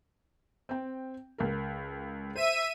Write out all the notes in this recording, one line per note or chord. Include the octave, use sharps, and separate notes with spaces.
C4 G5
C#2 A#4
C5 E5 D#7